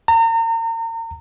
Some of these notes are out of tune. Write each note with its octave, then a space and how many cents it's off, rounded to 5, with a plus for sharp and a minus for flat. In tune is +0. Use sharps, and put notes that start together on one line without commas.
A#5 -35